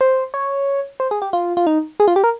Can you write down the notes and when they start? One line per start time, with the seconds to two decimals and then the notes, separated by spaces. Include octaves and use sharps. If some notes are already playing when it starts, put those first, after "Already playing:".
0.01 C5
0.34 C#5
1.00 C5
1.11 G#4
1.22 G4
1.33 F4
1.57 F4
1.67 D#4
2.00 G#4
2.08 F4
2.16 G4
2.24 A#4